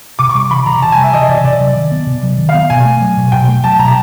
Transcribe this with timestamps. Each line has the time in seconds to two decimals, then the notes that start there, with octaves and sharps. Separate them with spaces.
0.19 C3 D6
0.29 C#6
0.35 G3
0.50 E3 B5
0.66 C3 A#5
0.82 C3 A5
0.92 G#5
0.98 G3
1.03 E5
1.13 E3 D#5
1.29 C3 D5
1.44 C3 D5
1.60 F#3
1.76 D#3
1.91 B3
2.07 C3
2.23 F#3
2.38 D#3
2.49 F5
2.54 B3
2.70 B2 G#5
2.85 A3
3.01 F#3
3.17 B2
3.32 B2 G5
3.48 A3
3.64 F#3 A5
3.79 B2 A#5